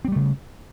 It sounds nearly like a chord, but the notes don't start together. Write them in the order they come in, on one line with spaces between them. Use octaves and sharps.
C4 G3 A3 C#3